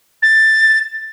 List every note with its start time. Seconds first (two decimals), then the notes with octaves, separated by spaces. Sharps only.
0.22 A6